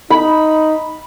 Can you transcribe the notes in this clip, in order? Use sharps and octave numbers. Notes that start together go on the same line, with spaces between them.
D#4 B5